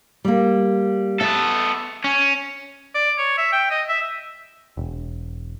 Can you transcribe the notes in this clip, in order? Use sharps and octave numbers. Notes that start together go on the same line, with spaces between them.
G3 A#3
B3 A4 E5
C#4
D5
C#5
E5
G5
D#5
E5
E1